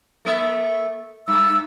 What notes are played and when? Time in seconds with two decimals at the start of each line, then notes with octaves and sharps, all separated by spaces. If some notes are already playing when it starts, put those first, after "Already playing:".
0.25 A3 A#3 E5
1.28 G2 E6